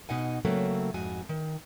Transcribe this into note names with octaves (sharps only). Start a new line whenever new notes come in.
B2 D#4 D#5 F#5 G#5
C#3 F#3 A3 A#3 C4
F2 G#2 F#4 G#5
D#3